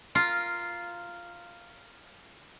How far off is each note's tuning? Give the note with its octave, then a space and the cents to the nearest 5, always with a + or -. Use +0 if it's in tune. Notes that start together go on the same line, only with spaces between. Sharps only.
F4 -5 A#4 +0